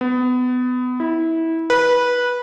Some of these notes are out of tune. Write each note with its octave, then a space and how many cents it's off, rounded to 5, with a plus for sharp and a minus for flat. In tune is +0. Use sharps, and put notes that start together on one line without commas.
B3 +25
E4 -20
B4 -15